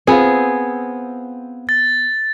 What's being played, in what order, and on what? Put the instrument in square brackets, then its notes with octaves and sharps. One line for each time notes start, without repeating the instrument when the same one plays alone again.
[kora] B3 G#4 [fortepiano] C4 F4
[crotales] A6